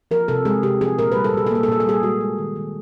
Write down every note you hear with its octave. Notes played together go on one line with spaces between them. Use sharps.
F3 A#4
C3 A4
G#3 G#4
C3 G4
F3 G#4
A#2 A#4
B4
G3
A4
A#2 G#4
A4
A#3 G#4
A4
A#2 G#4
A4
G3 G#4
G#3 F#4
G#3
D#3
D#3